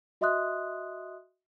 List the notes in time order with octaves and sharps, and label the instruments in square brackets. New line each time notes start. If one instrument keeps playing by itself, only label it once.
[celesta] F#4 D#5 E5 C6 D#6 F#6